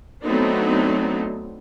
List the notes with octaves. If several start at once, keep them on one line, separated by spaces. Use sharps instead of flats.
F#3 A3 B3 C4 D4 D#4